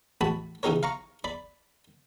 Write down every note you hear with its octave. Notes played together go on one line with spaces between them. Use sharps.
A1 F#4 A5 B5
C#3 E3 D#4 G4 A#4 C#5
F5 A#5 C#6
D5 B5